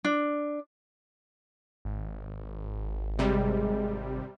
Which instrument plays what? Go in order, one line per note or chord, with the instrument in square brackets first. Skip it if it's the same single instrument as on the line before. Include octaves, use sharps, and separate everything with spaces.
[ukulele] D4
[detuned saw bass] G#1
[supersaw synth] C3 G3 [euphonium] G#3